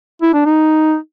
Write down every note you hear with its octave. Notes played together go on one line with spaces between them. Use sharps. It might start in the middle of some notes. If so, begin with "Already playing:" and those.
E4
D4
D#4